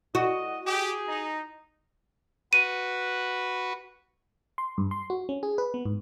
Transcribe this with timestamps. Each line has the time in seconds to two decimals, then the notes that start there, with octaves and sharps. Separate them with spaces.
0.15 F#4 D#5
0.66 G4 G#4
1.08 D#4
2.53 F#4 B4 D#7
4.58 C6
4.78 G2
4.91 C6
5.10 F#4
5.29 C#4
5.43 G#4
5.58 B4
5.74 B3
5.85 G#2